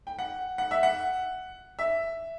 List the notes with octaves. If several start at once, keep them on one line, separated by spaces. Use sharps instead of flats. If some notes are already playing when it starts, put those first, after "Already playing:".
G5
F#5
F#5
E5
F#5
E5